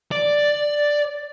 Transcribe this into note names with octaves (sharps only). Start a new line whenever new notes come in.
D5